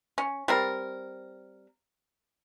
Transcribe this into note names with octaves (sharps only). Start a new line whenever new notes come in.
C#4
G3 C4 A#4